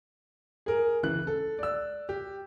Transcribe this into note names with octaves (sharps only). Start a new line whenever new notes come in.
G#4 A#4
C#3 E3 F#6
A4
D5 E6
G4